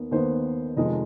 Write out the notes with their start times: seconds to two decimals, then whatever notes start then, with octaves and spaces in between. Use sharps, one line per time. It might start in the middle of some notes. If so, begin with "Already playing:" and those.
Already playing: D#2 D#3 B3
0.11 D#2 D#3 B3 C5
0.76 F1 F2 D#3 G#3 D#5